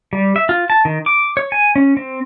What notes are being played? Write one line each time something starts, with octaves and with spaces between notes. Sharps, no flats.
G3
E5
F4
A5
D#3
D6
C#5
G#5
C#4
C4